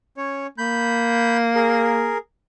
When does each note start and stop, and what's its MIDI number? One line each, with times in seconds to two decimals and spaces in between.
0.17 0.47 61
0.17 0.47 73
0.58 2.14 58
0.58 1.37 83
0.58 1.37 91
1.55 2.18 68
1.55 2.18 70